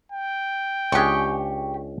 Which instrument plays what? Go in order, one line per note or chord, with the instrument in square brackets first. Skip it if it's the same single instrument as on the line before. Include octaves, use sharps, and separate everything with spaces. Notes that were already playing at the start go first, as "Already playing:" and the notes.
[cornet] G5
[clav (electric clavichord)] C#2 D4 G#4 [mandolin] G4 C#6